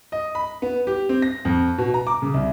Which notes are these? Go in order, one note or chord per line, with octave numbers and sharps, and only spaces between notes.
D#5
B5
B3
G4
C4
A#6
F2
B2
A#5
D6
C#3
C2